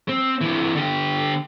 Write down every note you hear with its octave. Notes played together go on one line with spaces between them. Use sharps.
C4
C3 E3
D3 G4